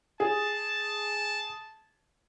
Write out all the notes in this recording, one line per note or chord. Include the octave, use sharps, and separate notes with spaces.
G#4 A5